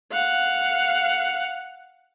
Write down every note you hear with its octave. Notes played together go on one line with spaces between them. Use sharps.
F5 F#5